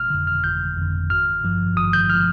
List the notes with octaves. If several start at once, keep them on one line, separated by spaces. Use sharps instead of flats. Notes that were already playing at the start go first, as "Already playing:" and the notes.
Already playing: G1 F6
F2 D3
F6
G1 G6
F2 D3
G#1 F6
G2 F3
G#1 D#6
G6
F6
F3